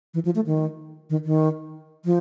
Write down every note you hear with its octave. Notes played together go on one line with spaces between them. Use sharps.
E3
F3
A3
D#3
D#3
D#3
F3